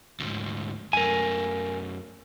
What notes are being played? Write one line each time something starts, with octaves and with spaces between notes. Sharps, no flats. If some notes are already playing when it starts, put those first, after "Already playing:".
D2 G#2
F#2 A3 A#4 G#5